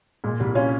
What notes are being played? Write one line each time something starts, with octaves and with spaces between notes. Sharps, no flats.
A#2 G#3
C2 G3
C#4 F4